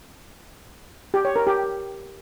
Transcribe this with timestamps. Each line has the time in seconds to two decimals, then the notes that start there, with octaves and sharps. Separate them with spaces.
1.14 G4
1.25 C#5
1.36 A#4
1.47 G4